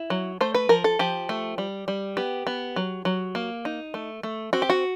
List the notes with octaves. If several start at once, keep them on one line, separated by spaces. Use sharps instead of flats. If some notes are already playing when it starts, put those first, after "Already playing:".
Already playing: E4
F#3
A3 C5
B4
F3 A#4
A4
F3 G4
A3
G3
G3
B3 G4
B3
F#3
F#3
A#3
D#4
A3
A3
C4 F#4
G4
F#4